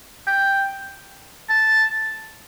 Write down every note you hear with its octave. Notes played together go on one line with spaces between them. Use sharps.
G5
A5